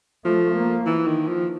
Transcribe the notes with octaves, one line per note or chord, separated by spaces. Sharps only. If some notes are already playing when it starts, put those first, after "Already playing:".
F3 A3
A#3
E3
D#3
F3